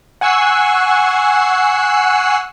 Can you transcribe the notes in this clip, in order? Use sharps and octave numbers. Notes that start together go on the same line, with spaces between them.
F#5 G#5 C#6 E6 F#6 C7